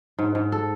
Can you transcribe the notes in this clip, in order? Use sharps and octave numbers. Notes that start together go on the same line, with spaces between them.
G#2
G#2
A4